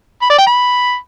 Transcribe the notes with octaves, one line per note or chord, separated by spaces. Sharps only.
B5
D5
G5
B5